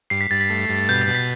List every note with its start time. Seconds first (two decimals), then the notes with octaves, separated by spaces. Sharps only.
0.10 G2 C7
0.21 B6
0.30 G2 A6
0.41 B6
0.50 A3
0.69 G2
0.89 B2 G6
1.01 A6
1.07 B2
1.15 B6